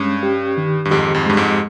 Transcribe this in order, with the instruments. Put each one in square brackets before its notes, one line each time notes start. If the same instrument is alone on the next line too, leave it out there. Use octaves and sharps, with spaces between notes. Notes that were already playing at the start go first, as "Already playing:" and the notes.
Already playing: [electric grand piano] G2 [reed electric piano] G#3 C#4
[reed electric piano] G4
D#3
[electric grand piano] G2
[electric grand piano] F2 G#2 [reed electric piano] G4
[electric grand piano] F2 G#2
[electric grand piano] G2 [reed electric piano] G#3
[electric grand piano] F2 G#2